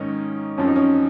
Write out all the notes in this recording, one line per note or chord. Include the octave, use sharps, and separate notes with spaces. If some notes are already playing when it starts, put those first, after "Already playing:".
Already playing: G#2 D#3 A#3 C#4 D#4
F#2 F3 C4 C#4
D#4
C#4